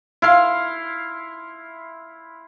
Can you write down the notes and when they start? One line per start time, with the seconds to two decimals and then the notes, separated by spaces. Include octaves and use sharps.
0.22 E4 F5 C6